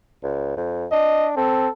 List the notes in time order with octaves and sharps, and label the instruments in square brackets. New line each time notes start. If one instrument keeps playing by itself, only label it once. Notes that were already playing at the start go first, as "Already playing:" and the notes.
[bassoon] C#2
F2
[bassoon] D4 [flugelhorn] D#5
[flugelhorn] C4 [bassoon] A4